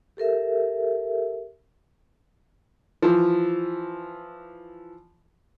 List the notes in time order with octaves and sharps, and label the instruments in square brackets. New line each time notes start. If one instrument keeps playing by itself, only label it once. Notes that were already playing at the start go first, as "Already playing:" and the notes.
[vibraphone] G4 A4 A#4 E5
[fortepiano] E3 F3